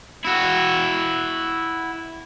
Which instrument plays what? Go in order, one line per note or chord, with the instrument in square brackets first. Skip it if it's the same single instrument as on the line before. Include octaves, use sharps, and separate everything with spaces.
[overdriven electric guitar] E4 F#4